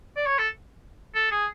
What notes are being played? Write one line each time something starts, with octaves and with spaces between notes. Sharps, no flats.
D5
C#5
A4
A4
G#4